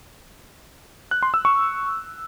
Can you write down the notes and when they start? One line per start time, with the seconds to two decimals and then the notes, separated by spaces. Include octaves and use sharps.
1.11 F#6
1.23 C6
1.34 E6
1.45 C#6